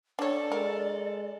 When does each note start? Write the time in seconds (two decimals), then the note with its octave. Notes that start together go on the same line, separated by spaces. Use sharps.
0.19 D4 A4 C#5 D5
0.52 G#3 A#4